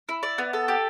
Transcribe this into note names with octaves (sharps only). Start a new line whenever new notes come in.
E4
D5
B3
A4
G4